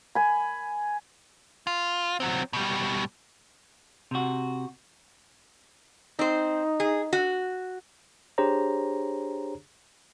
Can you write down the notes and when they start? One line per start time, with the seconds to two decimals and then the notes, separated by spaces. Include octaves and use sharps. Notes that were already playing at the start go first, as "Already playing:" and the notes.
0.15 G#5 B5
1.67 F4
2.20 F#3 C4
2.53 B2 G3
4.11 C3 F#4
6.19 C4 D#4 C5
6.80 G#4
7.13 F#4
8.38 D4 G4 G#4 C5 C#5 A#5